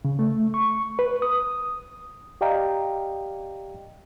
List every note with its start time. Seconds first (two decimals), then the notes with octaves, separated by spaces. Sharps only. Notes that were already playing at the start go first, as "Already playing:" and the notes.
0.05 C#3
0.19 A3
0.54 C#6
0.99 B4
1.22 D#6
2.41 G4 D5 D#5 F5 G5 A#5